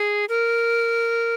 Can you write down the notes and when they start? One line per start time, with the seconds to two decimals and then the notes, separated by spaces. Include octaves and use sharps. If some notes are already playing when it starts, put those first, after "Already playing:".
Already playing: G#4
0.29 A#4